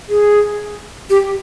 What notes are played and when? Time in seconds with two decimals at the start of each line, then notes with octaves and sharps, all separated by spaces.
0.09 G#4
1.10 G4